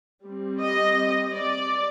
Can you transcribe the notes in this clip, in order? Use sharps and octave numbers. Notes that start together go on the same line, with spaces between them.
G3 C4
D#5
D5